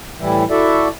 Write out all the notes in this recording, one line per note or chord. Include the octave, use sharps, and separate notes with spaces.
A2 E3 G3 E4
E4 F#4 A4 D5 E5